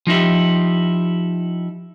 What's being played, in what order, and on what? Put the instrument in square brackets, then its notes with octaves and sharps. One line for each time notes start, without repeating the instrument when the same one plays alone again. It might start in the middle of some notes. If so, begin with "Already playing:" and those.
[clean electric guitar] F3 D#4 E4 G4